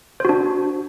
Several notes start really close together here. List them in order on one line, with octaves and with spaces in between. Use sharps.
C5 F#4 D4